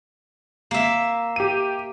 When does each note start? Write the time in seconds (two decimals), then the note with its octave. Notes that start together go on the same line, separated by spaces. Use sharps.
0.71 A#3 E5
1.36 G4 D#7